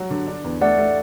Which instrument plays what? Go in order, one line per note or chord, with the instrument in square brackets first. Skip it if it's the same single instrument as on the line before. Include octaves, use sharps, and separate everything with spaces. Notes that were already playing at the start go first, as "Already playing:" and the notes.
Already playing: [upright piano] F#3 F#4
D3
D4
E2
[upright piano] A3 [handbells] D5 F#5
[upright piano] A3